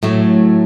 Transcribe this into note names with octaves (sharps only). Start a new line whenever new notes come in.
A2 F#3 A3